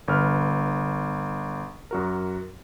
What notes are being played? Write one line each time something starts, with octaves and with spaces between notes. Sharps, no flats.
G1 B4 F6
F#2 F#4 A#4